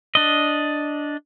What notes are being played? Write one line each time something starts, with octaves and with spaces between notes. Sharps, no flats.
D4 D#5